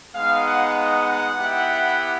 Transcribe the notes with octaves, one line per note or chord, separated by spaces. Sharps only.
G#3 B3 D#4 F5
F#5
F#5
B3 E4 G4